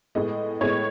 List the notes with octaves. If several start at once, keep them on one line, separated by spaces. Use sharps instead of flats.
A2 G#3 B3 D#5
A2 G#3 B3 C#5